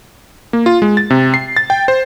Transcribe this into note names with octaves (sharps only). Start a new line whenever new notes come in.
A#3
F4
G#3
A6
C3
C7
A6
G5
C5